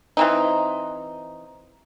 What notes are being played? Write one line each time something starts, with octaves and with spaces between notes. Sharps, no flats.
E3 C4 D#4